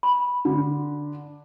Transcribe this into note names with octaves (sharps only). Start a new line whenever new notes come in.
B5
D3